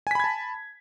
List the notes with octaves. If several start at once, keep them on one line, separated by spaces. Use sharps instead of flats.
G#5 A5 B5 G#6 B6